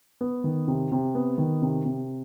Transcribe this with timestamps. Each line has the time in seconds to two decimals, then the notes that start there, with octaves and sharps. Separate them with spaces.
0.21 B3
0.44 D#3
0.68 C3
0.92 C3
1.15 B3
1.38 D#3
1.62 C3
1.85 C3